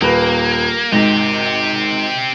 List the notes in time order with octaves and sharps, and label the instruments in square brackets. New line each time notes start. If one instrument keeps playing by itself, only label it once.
[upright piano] D#1 B4 [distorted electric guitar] A#3
[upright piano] G#1 G#2 A#6 [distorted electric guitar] C4 G4